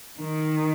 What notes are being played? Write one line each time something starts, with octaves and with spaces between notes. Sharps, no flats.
D#3